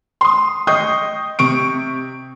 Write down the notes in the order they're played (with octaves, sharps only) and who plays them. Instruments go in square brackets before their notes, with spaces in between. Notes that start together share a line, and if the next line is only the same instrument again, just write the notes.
[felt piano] C6 D#6
D#5 G5 C#6 D#6 G6 C7
C3 C#6 D7